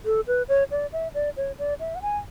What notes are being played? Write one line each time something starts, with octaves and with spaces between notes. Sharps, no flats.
A4
B4
C#5
D5
E5
D5
C#5
D5
E5
F#5
G#5